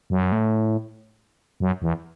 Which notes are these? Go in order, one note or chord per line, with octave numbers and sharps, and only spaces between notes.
F#2
A2
F#2
E2